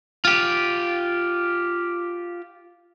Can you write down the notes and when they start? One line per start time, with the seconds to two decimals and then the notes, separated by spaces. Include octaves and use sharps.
0.25 F4 G4